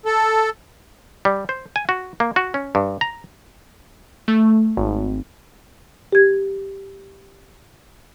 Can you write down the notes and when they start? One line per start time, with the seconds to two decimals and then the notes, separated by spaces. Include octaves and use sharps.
0.06 A4
1.25 G3
1.49 C5
1.76 G#5
1.89 F#4
2.20 A#3
2.36 F#4
2.54 C#4
2.75 G2
3.01 A#5
4.28 A3
4.77 G#1
6.13 G4 G#6